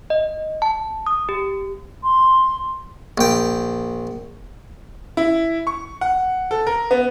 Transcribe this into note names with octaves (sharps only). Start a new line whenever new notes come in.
D#5
A5
D#6
G4
C6
A#1 G5
E4
C#6
F#5
A4
A#4
B3